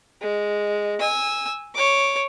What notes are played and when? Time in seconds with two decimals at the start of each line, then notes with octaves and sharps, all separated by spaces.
0.21 G#3
1.00 G#5 E6
1.75 C#5 D6